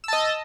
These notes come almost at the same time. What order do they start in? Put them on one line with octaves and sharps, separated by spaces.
E6 A5 D#5